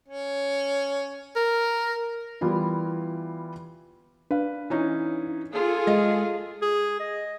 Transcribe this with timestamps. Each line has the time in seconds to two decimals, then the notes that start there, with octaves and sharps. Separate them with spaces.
0.08 C#4
1.36 A#4
2.41 E3 G3 B3 E4 F4
4.31 D4 B4 F5
4.70 E3 C#4 D#4
5.54 F4 G#4 A4
5.87 G#3 D#5 F5
6.62 G#4
7.00 D#5